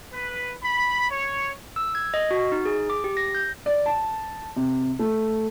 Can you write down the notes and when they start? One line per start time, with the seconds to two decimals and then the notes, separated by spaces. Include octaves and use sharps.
0.14 B4
0.63 B5
1.10 C#5
1.76 E6
1.95 G#6
2.14 D#5
2.31 F#4
2.52 D#4
2.65 G#4
2.90 D6
3.04 G4
3.17 A#6
3.35 G6
3.66 D5
3.86 A5
4.56 C3
4.99 A3